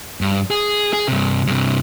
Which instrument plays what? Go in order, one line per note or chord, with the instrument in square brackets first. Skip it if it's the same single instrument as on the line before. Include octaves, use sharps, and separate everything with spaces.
[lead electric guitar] G2
G#4
G#4
G2 C3
G2 C3